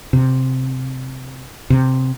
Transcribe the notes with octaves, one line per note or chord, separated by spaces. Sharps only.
C3
C3